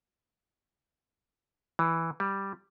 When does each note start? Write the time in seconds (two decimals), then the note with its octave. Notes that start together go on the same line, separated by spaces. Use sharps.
1.79 E3
2.20 G3